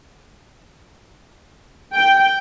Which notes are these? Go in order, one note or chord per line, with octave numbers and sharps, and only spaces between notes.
G5